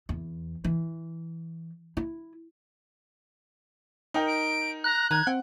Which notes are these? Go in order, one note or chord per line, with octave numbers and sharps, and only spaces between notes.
E2
E3
E4
D#4 A#4 G5
D7
A#5 F#6
D#3 A#5 G#6
C4 F#5